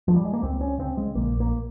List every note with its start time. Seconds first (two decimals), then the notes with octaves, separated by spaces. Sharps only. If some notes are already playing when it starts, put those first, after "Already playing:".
0.08 F3
0.16 G3
0.25 G#3
0.33 A#3
0.43 C#2 C4
0.61 C#4
0.78 C#3 C4
0.97 G#3
1.15 A#1 A#3
1.40 A#3